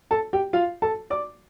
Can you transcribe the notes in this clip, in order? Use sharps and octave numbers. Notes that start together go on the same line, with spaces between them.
A4 A5
G4 G5
F4 F5
A4 A5
D5 D6